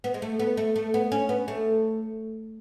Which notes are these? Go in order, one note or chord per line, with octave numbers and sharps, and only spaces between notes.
B3
G#3
A3
B3
A3
A3
B3
C#4
B3
A3